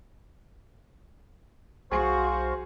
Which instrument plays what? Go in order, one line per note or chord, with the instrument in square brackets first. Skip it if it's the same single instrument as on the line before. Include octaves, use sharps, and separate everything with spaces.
[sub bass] B1 [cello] F#4 [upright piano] G#4 [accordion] C5 F5 C#6